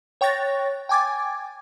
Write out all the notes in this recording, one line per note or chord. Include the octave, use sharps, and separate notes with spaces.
C#5 G5 C#6 F#6 A6 A#6
G5 G#5 D6 G#6 A6